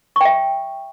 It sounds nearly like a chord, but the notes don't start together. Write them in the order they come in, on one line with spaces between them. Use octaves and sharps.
C#6 G5 E5